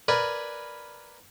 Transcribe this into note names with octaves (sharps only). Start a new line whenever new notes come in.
A#4 B4 D5 G#5